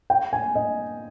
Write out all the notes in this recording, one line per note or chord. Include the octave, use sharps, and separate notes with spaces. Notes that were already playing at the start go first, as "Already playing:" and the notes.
G5
G#5
D#5